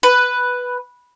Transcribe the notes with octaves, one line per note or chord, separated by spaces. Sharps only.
B4